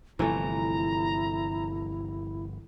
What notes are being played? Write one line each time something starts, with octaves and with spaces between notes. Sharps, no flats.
G1 C3 E3 F3 A3 E4 A#5